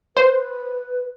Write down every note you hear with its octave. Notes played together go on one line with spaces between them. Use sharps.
B4 C5